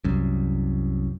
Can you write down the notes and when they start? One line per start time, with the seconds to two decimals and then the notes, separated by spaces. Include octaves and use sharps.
0.04 C2 F#2